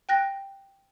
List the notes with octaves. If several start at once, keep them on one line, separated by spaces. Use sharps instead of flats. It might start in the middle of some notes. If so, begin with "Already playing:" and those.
G5 F#6 A#6